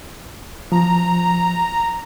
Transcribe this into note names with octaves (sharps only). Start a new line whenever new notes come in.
F3 A#5